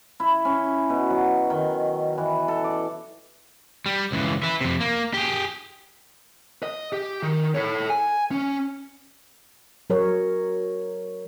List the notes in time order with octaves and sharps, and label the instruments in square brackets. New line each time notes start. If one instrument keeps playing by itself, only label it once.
[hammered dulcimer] E4
C#4
B2
F#3
D#3
E3
A4
D5
[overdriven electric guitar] G3
C#2 E3
B4 E5
F2 C3
A#3
G4 G#4
[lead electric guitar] D#5
G4
D#3
A4 C#5
G#5
C#4
[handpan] F#3 A#4 C#5